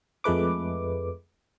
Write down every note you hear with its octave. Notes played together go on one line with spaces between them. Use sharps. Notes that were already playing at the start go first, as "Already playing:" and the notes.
F2 G#3 A3 B4 D6